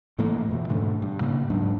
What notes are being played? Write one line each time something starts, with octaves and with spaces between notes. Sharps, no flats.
A2 E3 A3 A#3
F2 B2 E3
G#2 B2 D3 A3
G2
A2 C#3 A#3
D#1 G#2 F#3 D4